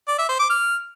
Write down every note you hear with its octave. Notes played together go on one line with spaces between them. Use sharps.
D5
E5
C5
D6
F6